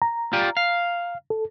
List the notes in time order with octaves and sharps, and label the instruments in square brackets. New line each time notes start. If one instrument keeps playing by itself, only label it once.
[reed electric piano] A#5
[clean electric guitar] F4 G4 D5
F5
[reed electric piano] A4